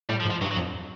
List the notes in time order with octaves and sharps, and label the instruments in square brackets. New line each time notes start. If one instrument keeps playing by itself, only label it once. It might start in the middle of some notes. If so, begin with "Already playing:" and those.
[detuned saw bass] A2 [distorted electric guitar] G3
[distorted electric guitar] F3
[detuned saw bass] G#2
[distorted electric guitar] F3
[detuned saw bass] G2 [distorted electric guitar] F#3
[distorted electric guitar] F#3
[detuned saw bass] F2